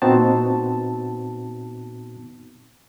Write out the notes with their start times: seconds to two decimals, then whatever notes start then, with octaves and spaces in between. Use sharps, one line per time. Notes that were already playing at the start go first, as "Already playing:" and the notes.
0.02 A#2 B3 C4 D#4 F#4 A5